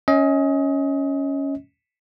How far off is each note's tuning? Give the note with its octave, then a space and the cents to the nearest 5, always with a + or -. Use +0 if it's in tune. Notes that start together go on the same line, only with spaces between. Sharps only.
C#4 +0 D#5 +30